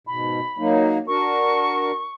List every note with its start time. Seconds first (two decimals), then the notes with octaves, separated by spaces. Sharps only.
0.07 G#2 B2 B5
0.58 F#3 A#3 D#4
1.08 D4 F#4 A#4 C#6